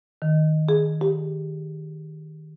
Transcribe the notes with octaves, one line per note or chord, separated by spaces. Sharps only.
D#3
G#4
G4